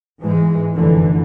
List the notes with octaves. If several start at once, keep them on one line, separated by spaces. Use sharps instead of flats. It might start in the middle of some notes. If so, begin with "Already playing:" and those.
G#2 E3 G#3
F1 F#2 D3 E3